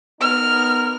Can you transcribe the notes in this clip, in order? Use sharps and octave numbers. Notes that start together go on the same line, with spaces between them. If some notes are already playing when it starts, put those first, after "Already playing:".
B3 D#4 A#4 F6